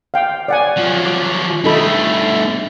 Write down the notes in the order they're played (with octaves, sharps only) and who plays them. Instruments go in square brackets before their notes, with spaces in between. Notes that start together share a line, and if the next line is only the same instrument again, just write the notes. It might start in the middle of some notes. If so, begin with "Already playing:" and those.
[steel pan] F5 G5
D5 F#5 G#5
[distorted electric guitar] F3 F#3
[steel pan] D6
[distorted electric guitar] G2 A3 [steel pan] D#4 A4 B5